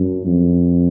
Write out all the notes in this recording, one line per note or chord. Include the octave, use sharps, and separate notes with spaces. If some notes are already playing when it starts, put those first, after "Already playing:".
Already playing: F#2
F2